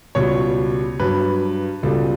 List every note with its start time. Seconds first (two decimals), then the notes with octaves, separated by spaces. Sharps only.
0.15 C#2 B2 G3 C#5
1.00 G2 F#3 B4
1.83 C#2 B2 G3 A4